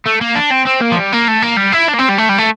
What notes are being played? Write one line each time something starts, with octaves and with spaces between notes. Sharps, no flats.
A3
A#3
D4
C4
C4
A#3
F3
G3
A#3
A3
A#3
G3
E4
D4
A#3
C4
G3
A3
G3
A3